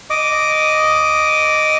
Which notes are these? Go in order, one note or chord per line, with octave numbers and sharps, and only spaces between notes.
D#5 D6